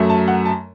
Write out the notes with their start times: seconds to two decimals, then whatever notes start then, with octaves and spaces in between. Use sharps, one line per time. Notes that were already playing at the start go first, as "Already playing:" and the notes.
Already playing: F#2 F#3 A3
0.09 A5
0.28 F#5
0.45 A5